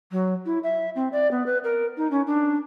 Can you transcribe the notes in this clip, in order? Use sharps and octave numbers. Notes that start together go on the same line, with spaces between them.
F#3
E4
E5
C4
D5
B3
B4
A#4
D#4
C#4
D4